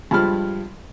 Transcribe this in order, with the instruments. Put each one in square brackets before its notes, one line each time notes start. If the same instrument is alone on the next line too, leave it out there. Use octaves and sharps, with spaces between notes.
[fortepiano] G2 F3 G#3 A5 B5 F6